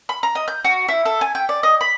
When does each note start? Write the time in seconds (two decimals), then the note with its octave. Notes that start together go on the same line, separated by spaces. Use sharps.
0.09 B5
0.23 A#5
0.35 D#5
0.48 G6
0.65 F#4
0.89 E4
1.05 A4
1.21 G#5
1.35 G5
1.49 D5
1.63 D#5
1.81 B5